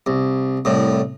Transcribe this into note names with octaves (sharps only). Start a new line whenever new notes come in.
C2
C2 A2